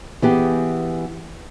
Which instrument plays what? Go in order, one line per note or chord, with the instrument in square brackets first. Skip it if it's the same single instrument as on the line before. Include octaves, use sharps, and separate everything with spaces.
[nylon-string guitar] E3 B3 G4 G#4